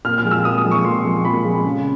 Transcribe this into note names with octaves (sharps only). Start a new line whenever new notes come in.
A#2 F6
F6
F3 G#3
E6
A#2 D#6
D#6
F3 G#3
C#6
A#2 C6
F3 G#3
A#2 B5
F3 G#3
C#3